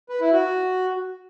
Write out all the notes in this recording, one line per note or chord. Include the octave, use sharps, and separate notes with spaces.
B4
E4
F#4